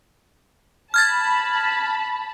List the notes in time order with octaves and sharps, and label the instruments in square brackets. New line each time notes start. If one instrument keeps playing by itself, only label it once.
[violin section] A5 B5 [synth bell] F6 G#6 A6